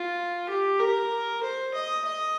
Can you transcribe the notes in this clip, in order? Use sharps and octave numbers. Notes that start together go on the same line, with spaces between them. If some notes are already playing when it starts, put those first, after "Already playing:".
Already playing: F4
G4
A#4
C5
D#5
D#5